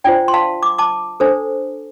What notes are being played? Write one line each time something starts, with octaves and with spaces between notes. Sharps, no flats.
D4 F4 C5 D5 G5
C6
F5 A5
D6
A5 D6
D4 A4 C5